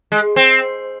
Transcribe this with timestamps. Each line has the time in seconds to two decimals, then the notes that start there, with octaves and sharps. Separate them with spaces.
0.12 G#3
0.36 C4